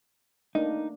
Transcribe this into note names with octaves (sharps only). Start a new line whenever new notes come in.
A3 A#3 D4 D#4